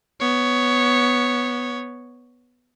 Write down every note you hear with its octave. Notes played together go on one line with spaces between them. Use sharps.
B3 C#5